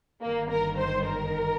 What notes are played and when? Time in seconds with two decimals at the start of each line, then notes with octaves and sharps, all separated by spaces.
0.21 G1 G2 D#3 A#3
0.50 A#4
0.78 C5
1.06 A#4